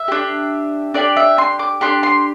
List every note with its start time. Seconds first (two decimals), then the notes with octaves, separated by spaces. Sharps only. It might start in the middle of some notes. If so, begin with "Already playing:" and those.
Already playing: E5
0.08 D4 G4
0.94 D4 G4 D5
1.17 E5
1.38 C6
1.59 D6
1.81 D4 G4 C6
2.03 C6